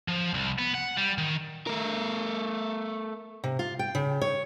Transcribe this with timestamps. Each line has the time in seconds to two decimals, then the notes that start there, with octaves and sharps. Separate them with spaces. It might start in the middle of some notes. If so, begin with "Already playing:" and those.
0.08 F3
0.34 C2
0.58 B3
0.74 F#5
0.97 G3
1.18 D#3
1.67 A3 A#4
3.44 C3
3.59 F4
3.79 G5
3.95 C#3
4.22 C#5